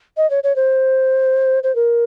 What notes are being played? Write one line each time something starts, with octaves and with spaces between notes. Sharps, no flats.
D#5
C#5
C#5
C5
C5
A#4